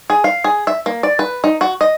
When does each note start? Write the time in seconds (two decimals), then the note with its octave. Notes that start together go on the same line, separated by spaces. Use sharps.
0.10 G#4
0.24 F5
0.44 G#4
0.67 E5
0.86 A#3
1.03 D5
1.19 B4
1.44 D#4
1.61 F#4
1.81 D#5